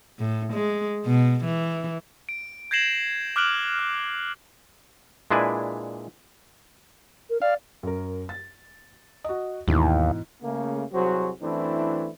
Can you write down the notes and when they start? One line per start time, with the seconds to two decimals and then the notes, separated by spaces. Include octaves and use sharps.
0.19 A2
0.53 G#3
1.06 B2
1.45 E3
2.29 D7
2.71 G6 G#6 A#6 C7 E7 F#7
3.36 D6 F6 F#6 D7 F#7
3.79 F6
5.31 A#2 G#3 D4 E4 B4 G#5
7.30 A#4
7.42 D5 F5
7.83 F#2 A#4
8.29 A6
9.24 F#4 D#5
9.68 D#2 G#2 B2 E3
10.42 C#3 A3 A#3
10.93 C2 F#3 F#4 G#4 C5
11.41 F#2 E3 A3 C4 D4 E4